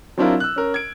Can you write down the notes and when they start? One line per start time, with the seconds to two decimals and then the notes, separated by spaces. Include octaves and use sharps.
0.18 F#3 C4 D4 E4 F4 A#4
0.40 E6 F#6
0.56 C#4 A#4
0.74 G#6 D7